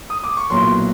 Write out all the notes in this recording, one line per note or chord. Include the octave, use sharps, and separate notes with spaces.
D#6
D6
C#6
B1 A#2 F#3 B3 E4 C6